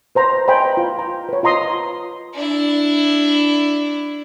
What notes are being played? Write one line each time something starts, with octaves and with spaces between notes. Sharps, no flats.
B4 C5 A#5
C5 D#5 G5 G#5 A#5 B5
F4
A#5
B4 C#5
F4 D#5 A#5 C6 D#6
D4 E4